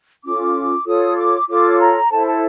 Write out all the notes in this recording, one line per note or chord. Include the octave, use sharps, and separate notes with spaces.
C#4 F4 A4 D6
F4 A4 C#5 D#6
D6
F4 A4 C#5 D6
A#5
E4 A4 C5 A5
A5